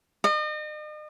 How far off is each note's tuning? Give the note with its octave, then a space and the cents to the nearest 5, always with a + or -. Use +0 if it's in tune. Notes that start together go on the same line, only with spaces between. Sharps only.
D#5 -40